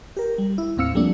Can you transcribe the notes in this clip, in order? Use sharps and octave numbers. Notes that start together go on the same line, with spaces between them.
G4 A#4
G3
E4
D#2 A2 C4 F5 E6 C#7
F3 G3 A3 A#3 D4